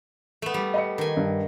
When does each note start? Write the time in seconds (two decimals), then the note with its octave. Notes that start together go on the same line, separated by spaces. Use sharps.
0.42 A3 B3
0.54 G3
0.74 D#5 B5 C#7
0.98 D#3 G#5
1.17 G2